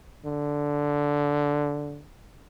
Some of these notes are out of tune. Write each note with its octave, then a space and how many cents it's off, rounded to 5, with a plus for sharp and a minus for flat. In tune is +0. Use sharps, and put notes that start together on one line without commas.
D3 -10